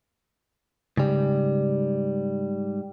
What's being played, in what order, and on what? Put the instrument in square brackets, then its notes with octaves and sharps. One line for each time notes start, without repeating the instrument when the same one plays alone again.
[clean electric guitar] G#2 G3 [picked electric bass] C#3